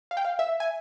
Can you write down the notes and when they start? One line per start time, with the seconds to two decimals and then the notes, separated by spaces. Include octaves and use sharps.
0.11 F5
0.17 G5
0.25 F5
0.39 E5
0.60 G#5